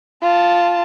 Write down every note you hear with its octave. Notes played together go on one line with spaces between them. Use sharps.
F4 A5